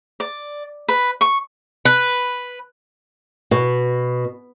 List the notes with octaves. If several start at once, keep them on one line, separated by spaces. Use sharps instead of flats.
D5
B4
C#6
B4
B2